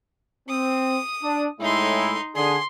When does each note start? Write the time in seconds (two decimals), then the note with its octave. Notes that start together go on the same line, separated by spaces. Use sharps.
0.49 C4 D#6
1.23 D4
1.61 A2 G#3 D#4 E4 C6
2.36 D3 G#4 C6